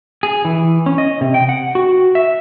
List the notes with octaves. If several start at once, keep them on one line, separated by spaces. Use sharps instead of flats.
G#4
E3
C#4
D#5
C3
G5
F#5
F#4
E5